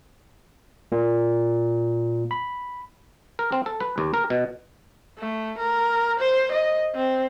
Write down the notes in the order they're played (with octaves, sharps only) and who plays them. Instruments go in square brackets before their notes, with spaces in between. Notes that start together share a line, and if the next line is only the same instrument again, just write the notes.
[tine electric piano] A#2
B5
[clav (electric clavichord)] A#4
C4
A4
B4
D#2
A#4
B2
[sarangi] A3
A#4
C5
D#5
C4